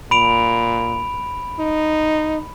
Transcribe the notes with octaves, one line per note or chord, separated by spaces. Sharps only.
A#2 B5 D7 F7
D#4